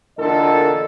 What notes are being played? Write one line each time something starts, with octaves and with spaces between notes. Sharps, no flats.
E2 A#2 D3 A4 A#4 D#5